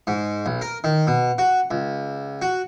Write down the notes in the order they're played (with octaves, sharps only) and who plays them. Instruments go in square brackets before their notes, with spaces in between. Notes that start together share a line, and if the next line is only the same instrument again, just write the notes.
[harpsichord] G#2
B1
A#4
D#3
B2
F#4
C#2
F#4